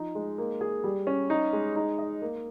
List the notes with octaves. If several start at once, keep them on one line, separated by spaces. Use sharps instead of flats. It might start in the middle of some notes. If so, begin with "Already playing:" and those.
Already playing: F3 D#4
G#3
A#3
G#4
G3
C#4
D#4
G#3
D#4
D#5
A#3